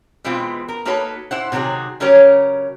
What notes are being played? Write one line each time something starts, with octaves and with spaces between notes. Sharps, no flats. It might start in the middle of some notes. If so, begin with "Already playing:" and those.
B2 E3 G#3 C4 F4
A#4
A#3 D#4 F#4 A4 B4 C#5
E4 C5 F#5
C3 D#3 F#3 F#4 G#4
C#3 F#3 C#4 G4 A#4 C#5